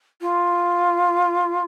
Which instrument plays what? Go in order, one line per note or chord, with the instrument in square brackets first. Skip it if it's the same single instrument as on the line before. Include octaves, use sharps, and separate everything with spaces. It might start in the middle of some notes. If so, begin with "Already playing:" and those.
[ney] F4